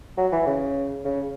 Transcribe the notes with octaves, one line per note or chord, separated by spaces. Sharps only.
F#3
E3
C#3
C#3